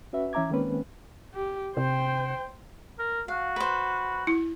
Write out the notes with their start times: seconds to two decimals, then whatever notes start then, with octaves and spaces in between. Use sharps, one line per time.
0.13 C#4 F#4 B4 E5
0.33 E3 C#4 E5 A#5 D6 G#6
0.50 D#3 G#3 A#3 C4 C#4 B4
1.34 G4
1.77 C3 C5 G5
2.99 A#4
3.28 F#4 F5
3.56 B4 C5
4.27 E4